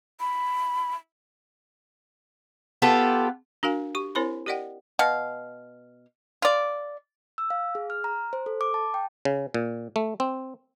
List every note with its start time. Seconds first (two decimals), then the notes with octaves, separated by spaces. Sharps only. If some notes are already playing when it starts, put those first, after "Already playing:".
0.20 B5
2.82 B3 F4 G4 A4
3.63 D4 F#4 A#4 F5 G#5
3.95 G4 C#6
4.15 C4 E4 A#4 C5 C#5 B5
4.46 G4 A#4 D5 D#5 F#5 G5
4.99 B2 F5
6.42 F4 D5
7.38 E6
7.50 F5
7.75 G#4
7.90 F6
8.04 A#5
8.33 C5
8.46 A4
8.61 D6
8.74 A5
8.94 G5
9.25 C#3
9.54 A#2
9.96 A3
10.20 C4